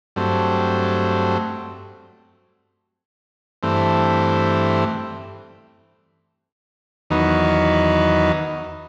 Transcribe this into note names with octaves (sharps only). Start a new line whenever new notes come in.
G2 F#3 A3 C4
G2 E3 A3 C4
E2 D#3 F#3 B3 D#4